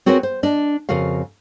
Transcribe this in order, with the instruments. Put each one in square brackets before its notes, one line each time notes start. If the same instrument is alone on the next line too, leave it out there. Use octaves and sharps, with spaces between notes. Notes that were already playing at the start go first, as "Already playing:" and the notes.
[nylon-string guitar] C4 F#4 G#4 A#4 B4 C#5
C5
D4 D5 D#5
F2 C#3 F#4 A#4 F5